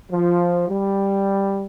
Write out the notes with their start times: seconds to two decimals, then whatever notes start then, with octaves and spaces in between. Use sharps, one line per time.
0.11 F3
0.68 G3